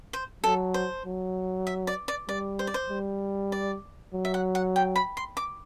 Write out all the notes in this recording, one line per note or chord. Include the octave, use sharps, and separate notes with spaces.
C5
F#3 A4
C5
F#3
E5
D5
D5
G3 D5
C5
D5
C5
G3
D5
F#3
E5
F#5
F#5
G5
B5
C6
D6